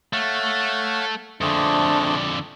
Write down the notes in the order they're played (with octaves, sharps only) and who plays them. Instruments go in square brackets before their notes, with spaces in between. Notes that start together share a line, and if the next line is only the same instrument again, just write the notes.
[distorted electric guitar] A3 [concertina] C#5 F5 F#5
[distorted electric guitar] F2 D3 [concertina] A3 C4 G#4 [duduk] D4